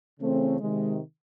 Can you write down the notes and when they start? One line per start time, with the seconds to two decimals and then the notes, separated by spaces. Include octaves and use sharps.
0.20 C#3 E3 A3 C4
0.59 C3 D#3 G#3